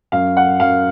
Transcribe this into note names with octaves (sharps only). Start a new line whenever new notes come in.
F#2 F5
F#5
F#2 F5